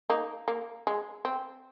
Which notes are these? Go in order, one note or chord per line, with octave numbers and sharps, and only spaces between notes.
A#3 D#4
A#3
G#3
C4